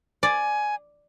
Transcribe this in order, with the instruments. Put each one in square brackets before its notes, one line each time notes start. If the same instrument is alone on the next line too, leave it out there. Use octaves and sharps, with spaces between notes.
[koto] D5 [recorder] G#5